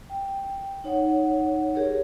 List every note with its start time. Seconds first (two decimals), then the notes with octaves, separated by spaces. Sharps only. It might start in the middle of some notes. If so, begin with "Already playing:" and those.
0.10 G5
0.84 D#4 C#5 F#5
1.75 G4 G#4 A#4 C#5